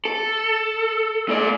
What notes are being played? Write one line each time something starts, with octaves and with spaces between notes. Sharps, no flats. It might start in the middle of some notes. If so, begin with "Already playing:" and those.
A4
A2 D5